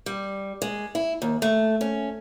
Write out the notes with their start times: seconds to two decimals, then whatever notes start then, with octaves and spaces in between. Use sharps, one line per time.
0.06 G3
0.62 G#3
0.95 E4
1.22 D#2
1.42 A3
1.81 C#4